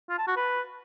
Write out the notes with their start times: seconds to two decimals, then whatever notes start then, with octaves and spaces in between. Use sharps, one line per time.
0.10 F4
0.19 A5
0.28 F#4
0.37 B4